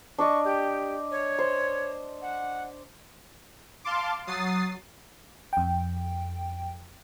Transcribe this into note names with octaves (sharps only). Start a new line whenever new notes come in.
D4 D5 D#5 C#6
G4
C#5
C5
F#5
F5 A5 C6 D6
F#3 D#6 A6 C7
F2 G5